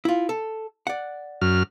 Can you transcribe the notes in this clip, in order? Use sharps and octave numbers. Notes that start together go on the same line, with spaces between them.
E4 F4
A4
D5 F#5
F#2 F6